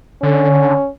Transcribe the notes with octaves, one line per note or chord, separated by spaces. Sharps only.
D3 C#4